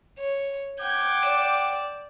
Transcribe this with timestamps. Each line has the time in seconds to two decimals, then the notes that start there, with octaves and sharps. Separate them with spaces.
0.19 C#5
0.80 F#5 G5 D6 G6 G#6
1.26 D5 E7